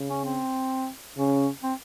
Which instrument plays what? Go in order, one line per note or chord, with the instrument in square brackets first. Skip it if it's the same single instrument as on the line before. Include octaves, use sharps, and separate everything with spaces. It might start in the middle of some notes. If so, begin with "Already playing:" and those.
Already playing: [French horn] C#3
[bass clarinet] C#4
C4
[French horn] C#3 [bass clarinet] C#4
[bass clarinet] C4